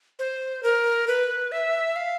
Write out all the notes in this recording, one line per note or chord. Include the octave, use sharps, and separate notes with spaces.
C5
A#4
B4
E5
F5